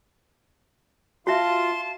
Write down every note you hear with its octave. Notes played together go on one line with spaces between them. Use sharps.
F4 F#4 E5 A5 C6